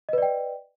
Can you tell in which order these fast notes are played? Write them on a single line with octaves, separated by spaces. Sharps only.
D#5 B4 D5 G5